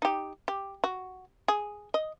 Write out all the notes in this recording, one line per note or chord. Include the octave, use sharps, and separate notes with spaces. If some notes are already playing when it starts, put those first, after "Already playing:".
D#4 G4
G4
F#4
G#4
D#5